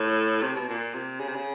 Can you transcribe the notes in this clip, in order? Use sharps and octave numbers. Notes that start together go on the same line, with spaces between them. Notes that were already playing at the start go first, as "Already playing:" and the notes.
Already playing: A2
C3
B2
A#2
C3
C#3
C3
C#3